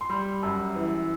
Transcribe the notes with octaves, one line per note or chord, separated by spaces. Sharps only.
C6
G3 B5
F#2
E3